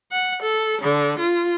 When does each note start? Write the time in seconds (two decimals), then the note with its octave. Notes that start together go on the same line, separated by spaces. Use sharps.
0.12 F#5
0.42 A4
0.82 D3
1.19 F4